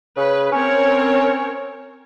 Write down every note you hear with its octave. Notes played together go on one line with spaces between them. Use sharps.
C#3 B4
C4 C#4 A#4 C#5